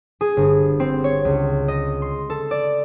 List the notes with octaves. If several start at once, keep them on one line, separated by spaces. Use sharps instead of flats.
G#4
G1
C4
C#5
C#2
D#5
C6
A4
D5